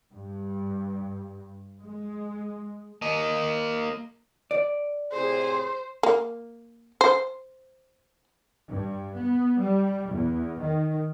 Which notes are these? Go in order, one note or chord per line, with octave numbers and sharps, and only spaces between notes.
G2
G#3
A#3 D#5
D5
A2 C3 G#4 C5
A#3
C5
G2
B3
G3
E2
D#3